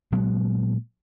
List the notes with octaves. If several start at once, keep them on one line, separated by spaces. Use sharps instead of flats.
A#2 F#3 G#3 B3